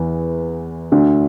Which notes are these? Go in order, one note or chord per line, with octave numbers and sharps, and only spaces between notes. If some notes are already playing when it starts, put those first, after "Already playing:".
Already playing: E2 E3
D2 D3